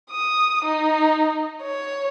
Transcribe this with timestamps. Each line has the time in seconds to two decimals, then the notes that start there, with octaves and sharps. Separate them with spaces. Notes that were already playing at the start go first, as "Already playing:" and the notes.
0.11 D#6
0.64 D#4
1.62 C#5